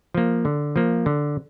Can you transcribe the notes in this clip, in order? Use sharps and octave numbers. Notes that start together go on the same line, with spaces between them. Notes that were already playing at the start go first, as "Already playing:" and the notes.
F3 A#3
D3
F3 A#3
D3